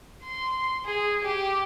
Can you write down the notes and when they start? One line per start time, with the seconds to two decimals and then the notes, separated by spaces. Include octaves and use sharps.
0.24 C6
0.85 G#4
1.25 G4